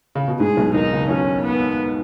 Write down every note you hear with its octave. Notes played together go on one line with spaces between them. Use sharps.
C#3
B2
G#2 G#4
B1 B2
D#2 D#3 D#4
C#2 C#3
B1 B2 C#4
B3